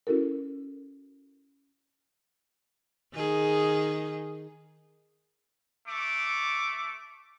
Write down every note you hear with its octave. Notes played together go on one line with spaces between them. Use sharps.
C#4 E4 F#4 A4 A#4
D#3 G#4
A3 D6